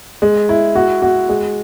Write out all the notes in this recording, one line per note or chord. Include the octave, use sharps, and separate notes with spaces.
G#3
E4
F#4
F#4
G#3